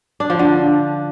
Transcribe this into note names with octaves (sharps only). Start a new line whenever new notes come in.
D4
F3
D3